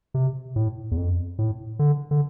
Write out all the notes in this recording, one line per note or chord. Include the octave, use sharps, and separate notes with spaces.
C3
A2
E2
F2
A2
D3
D3